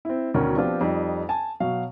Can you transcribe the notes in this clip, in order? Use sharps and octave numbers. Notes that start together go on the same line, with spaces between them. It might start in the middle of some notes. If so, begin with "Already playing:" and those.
C4 E4
D2 B2 D#3 C#4 A#4
F3 B3 C4 D4 F4 G4
F2 G3 D#4
G#5 A5
B2 F#3 F5